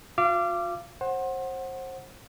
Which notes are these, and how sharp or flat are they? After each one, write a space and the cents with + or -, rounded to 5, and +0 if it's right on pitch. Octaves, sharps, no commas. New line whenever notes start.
F4 +40 F5 -35 D6 +0
C5 +30 F#5 +0